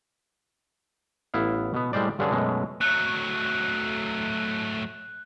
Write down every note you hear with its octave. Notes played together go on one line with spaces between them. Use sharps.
A1 B3 E4 F5
B2 B3
A2 G3 G#3 C5 D5
G2 D3 C#4 D4 G#4
F#2 B2 G#3 A3
F#3 A3 F#6